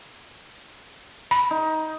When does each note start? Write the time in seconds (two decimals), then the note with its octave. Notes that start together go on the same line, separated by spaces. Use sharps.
1.31 B5
1.51 D#4